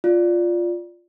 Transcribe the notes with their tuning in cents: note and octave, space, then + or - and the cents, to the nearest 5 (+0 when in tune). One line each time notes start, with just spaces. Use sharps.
F4 +0 D5 +0